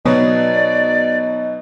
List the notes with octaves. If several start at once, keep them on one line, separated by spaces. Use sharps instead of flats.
B2 F#3 B3 D#4 D5